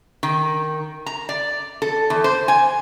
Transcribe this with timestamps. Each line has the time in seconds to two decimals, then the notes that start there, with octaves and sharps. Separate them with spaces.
0.23 D#3
1.06 A#5
1.29 D5
1.82 A4
2.10 E2
2.24 C5
2.48 G#5